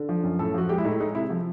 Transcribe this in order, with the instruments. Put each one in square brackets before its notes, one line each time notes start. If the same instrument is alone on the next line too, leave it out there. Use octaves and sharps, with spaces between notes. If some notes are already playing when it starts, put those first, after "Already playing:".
Already playing: [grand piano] D3
F3
F#2
A2 A4
F3 F#4
G#3 G4
E4
A2 D#4
G#3 D#4
C3 E4
F3